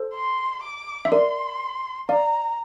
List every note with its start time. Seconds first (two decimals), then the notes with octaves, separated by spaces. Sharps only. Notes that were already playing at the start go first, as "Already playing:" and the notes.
Already playing: A4 C5
0.14 C6
0.63 D6
1.05 E5
1.12 A#4 D5 C6
2.09 D5 F5 A#5